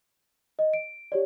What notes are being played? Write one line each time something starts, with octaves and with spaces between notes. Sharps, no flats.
D#5
D7
G4 C#5 D5